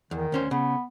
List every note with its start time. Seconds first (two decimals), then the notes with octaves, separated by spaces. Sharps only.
0.11 E2 D#3
0.32 D2 C#4 C5
0.51 C#3 B3